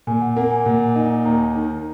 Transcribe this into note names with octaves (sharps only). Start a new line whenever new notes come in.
A#2 G#5
F#5
A#3 F#5
G#5
A#2
D#4
D#2 A#5
D#3